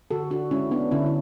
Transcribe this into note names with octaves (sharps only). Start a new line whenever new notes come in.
D3 F#4 A4
D4 F#4
G#3 C#4 E4
B3 D4
D3 C#4 E4
E4